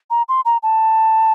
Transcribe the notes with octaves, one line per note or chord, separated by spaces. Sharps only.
A#5
C6
A#5
A5